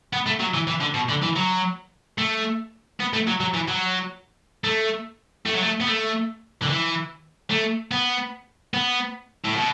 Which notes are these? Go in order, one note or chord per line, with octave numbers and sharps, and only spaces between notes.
B3
A3
F#3
E3
E3
D3
B2
D3
E3
F#3
A3
B3
A3
F#3
F#3
E3
F#3
A3
A3
F#3
A3
B3
A3
D3
E3
A3
B3
B3
A2
B2